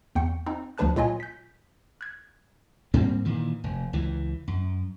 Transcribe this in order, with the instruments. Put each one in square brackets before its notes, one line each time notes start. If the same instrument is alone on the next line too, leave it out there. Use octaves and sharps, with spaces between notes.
[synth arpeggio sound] E2 G5 C#6 C#7
C4 D#4
D2 F3 D4 B4 A5 F#6
C2 A#2 F#3 F4 D#5 G#5
G6 B6
F#6 G#6
[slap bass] G#2 G3 A#3 C4
A#2 D#3 E3
F1
C#2 E3
F#2